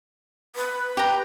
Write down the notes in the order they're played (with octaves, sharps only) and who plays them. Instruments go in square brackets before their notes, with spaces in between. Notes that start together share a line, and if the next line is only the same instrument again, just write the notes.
[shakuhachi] B4
[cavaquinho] G4 A#5